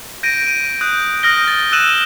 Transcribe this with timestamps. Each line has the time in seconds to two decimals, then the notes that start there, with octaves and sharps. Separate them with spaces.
0.23 G6 A#6 D7 D#7
0.47 D#7
0.81 D#6 F#6 G6
1.23 D#6 F6 G6 A#6 G7
1.47 A6 G7
1.72 E6 F#6 D#7 E7 F#7 G7